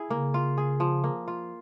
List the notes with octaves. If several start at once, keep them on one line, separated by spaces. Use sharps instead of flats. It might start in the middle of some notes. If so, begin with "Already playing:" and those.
Already playing: E4 G#4
C#3 A#3
F4
G#4
F3
A#3
F4